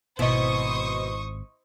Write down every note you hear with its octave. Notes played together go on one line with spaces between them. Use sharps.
G#1 B2 E4 C5 D#5 C#6 D#6